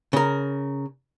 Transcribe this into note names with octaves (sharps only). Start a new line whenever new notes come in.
C#3 A#4